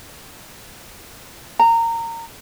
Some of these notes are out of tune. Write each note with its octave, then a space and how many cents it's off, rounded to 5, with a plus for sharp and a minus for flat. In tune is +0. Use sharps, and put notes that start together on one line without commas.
A#5 -20